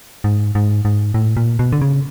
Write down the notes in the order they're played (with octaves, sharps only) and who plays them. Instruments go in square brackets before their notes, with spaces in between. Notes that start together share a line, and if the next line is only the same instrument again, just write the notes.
[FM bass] G#2
G#2
G#2
A2
A#2
B2
D3
C#3